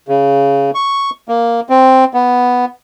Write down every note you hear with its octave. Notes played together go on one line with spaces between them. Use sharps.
C#3
C#6
A#3
C4
B3